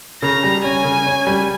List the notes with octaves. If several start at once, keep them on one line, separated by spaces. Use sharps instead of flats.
C#3 A#5
G3
C#4 G#5
C#3
C#4
G3